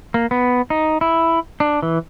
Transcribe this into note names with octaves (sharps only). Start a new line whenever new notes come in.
A#3
B3
D#4
E4
D4
E3